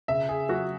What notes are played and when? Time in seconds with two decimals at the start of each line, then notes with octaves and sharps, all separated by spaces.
0.08 C#3 E5
0.29 G#4
0.49 F#3 F#4